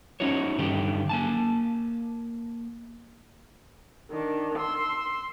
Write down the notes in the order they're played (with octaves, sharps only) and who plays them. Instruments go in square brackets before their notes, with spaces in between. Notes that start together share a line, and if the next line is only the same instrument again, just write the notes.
[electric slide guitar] C#4 D#4 E4 F#4 C#5
G2 D3 D#3 G4
A#3 G#5 A5
[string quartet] D#3 D4
C6 E6